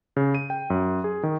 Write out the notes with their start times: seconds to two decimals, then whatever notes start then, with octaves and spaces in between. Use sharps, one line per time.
0.16 C#3
0.35 D#7
0.50 G5
0.70 F#2
1.04 G#4
1.23 D#3